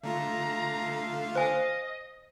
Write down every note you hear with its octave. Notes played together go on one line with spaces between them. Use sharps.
D3 A3 F4 F5 A#5
C5 D#5 G#5